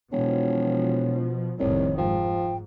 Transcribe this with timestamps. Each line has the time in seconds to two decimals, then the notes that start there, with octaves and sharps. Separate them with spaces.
0.12 E1 B2 F3 C#5
1.59 F1 C2 A2 D#3 C#5
1.98 G#2 F3 G5